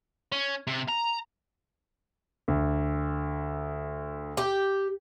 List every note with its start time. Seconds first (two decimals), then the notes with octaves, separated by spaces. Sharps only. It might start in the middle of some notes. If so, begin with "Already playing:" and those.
0.32 C#4
0.67 C3
0.89 A#5
2.48 D2
4.37 G4